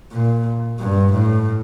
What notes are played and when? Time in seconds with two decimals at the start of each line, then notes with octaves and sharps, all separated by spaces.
0.12 A#2
0.79 G2
1.13 A2